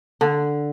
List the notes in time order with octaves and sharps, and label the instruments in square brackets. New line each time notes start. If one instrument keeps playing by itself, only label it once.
[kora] D3